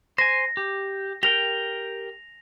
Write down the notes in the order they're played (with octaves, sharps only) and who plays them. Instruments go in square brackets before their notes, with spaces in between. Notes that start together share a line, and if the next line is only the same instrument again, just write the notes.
[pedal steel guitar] C5 G#5 [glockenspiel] A#6
[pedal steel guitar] G4
[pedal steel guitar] G4 A#4 G5 [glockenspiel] A#6 F7